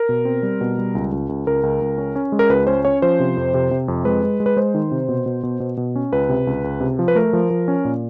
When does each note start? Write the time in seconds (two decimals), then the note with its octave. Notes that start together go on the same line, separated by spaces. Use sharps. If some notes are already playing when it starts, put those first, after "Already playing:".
Already playing: A#4
0.09 B2
0.25 C4
0.43 G3
0.61 B2
0.78 G3
0.95 C#2
1.12 C#2
1.29 C#2
1.47 C#2 A#4
1.63 C#2
1.81 C#2
1.98 C#4
2.16 C#4
2.32 G#3
2.39 A#4
2.49 C#2 B4
2.67 C#4 C5
2.85 C#4 C#5
3.02 F3 C5
3.20 C3
3.37 F2
3.54 C3
3.71 C3
3.88 F2
4.05 G#3 B4
4.23 G#3
4.40 G#3
4.46 B4
4.56 G#3 C5
4.74 D#3
4.91 C3
5.08 B2
5.26 B2
5.43 B2
5.60 B2
5.77 B2
5.96 C#4
6.12 C#2 B4
6.29 C3
6.47 C#2
6.64 C#2
6.81 C3
6.99 F3
7.08 B4
7.15 A3 A#4
7.33 F3
7.50 F3
7.68 C#4
7.85 A#2